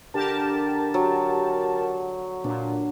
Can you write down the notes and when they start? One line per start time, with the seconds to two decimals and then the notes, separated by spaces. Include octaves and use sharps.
0.14 D3 G4 A#4 A5
0.94 F#3
2.44 A#2 D4